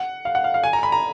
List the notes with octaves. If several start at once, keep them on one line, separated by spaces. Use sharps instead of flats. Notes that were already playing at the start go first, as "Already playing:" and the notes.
Already playing: F#5
F5
F#5
F5
F5
G#5
A#5
B5
A#5